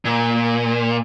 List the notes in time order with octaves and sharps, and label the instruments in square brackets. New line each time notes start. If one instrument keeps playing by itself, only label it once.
[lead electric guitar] A#2